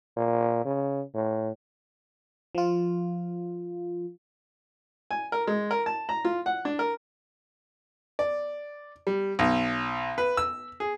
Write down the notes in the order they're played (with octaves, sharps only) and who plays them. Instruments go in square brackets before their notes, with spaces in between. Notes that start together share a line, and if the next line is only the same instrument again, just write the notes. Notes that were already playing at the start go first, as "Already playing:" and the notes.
[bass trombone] A#2
C#3
A2
[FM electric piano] F3 F4
[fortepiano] G#5
A#4
G#3
A#4
A5
A#5
F4
F#5
D4
A#4
D5
G3
B1
B4
E6
G#4